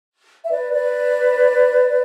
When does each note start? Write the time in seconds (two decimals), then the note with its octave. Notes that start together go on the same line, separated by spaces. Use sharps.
0.44 E5
0.50 B4 D5
0.73 B4 D5